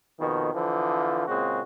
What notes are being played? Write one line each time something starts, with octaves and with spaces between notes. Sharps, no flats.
F2 B2 D#3
D3 E3 F3
A#2 C#3 G#3 C4 F#4